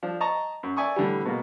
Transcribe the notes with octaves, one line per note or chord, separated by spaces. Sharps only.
F3 D4
D#5 A5 A#5 C#6
F#2
D5 E5 G#5 C#6 D#6
A2 D3 E3 G3
B2 G#3 A#3